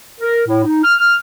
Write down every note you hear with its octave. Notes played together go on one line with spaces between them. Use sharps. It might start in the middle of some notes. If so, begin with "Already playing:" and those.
A#4
A2
D#4
F6